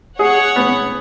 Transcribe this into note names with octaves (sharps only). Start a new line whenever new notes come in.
G#4 C#5 F#5
B3